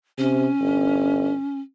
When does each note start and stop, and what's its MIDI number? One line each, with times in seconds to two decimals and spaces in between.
0.18 0.48 48
0.18 1.60 61
0.60 1.32 31